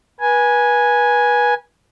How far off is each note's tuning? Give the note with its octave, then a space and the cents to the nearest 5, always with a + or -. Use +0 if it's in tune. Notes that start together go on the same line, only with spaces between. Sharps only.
B4 -30 G#5 +0